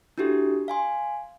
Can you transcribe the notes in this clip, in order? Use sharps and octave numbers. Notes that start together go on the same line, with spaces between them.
D4 E4 F#4 G4 A4
F5 G#5 C6